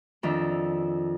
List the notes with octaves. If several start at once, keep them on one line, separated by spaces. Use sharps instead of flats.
F2 D#3 D4 E5 A#5